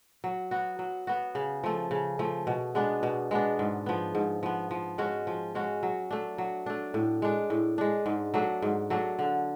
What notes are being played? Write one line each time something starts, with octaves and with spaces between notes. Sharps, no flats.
F#3
B3 F#4
F#3
B3 F#4
C#3
F3 A3
C#3
F3 A3
B2
G#3 B3 D4
B2
G#3 B3 D4
G#2
F3 B3
G#2
F3 B3
F3
G#3 C#4 F#4
F3
G#3 C#4 F#4
F#3
A3 D4
F#3
A3 D4
A2
G#3 D4
A2
G#3 D4
G#2
F#3 A3 D4
G#2
F#3 A3 D4
D3